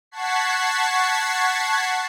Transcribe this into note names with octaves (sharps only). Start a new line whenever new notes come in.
F#5 A5 C#6 G#6 B6 C7